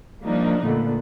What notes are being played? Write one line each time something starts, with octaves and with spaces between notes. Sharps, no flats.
F3 G3 A#3 D4 D#4
A#2 D3 A3 B3